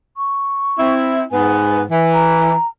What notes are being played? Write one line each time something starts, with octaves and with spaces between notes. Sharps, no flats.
C#6
C4 E4
G#2 B3 G#5
E3
A#5